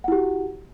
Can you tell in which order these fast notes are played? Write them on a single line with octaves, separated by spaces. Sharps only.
F#5 E4 G4 F#4